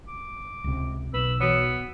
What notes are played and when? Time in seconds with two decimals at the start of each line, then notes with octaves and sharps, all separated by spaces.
0.08 D6
0.64 C#2 C3
1.14 B1 B4 E6
1.40 E3 B3 F#4 C#5